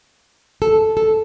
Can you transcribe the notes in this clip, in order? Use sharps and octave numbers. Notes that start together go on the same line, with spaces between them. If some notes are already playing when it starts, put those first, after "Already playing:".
A4
A4